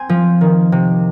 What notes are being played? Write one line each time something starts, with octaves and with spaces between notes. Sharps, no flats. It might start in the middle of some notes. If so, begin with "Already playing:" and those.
Already playing: C4 G#5
F3
D#3
C3